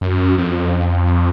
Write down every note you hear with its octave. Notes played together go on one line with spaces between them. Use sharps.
F#2
F2